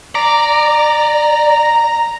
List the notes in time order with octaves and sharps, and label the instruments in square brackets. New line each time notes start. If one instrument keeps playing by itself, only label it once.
[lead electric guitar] D5 [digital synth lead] A#5